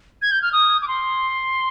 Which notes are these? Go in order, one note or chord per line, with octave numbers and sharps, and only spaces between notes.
G#6
G6
F6
D#6
D6
C6